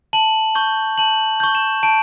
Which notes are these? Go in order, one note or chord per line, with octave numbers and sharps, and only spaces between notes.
A5 F#7
C#6 G6
A5 F#7
C#6 G6
E7
A5 D7